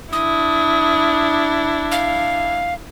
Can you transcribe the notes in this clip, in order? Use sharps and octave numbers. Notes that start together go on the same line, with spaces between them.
D4 E4 D#6
F5